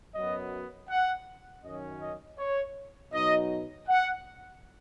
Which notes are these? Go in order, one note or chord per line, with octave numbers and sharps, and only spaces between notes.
F#2 F#3 B3 D#5
F#5
F#2 D#3 F#3 C#4 D#5
D#5
C#5
B2 F#3 D#4 D#5
F#5